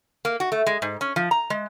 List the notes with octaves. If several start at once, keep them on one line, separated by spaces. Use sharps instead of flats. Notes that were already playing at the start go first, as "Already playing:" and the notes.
A#3
F#4
A3
G#3
G#2
C#4
F3
A#5
G#3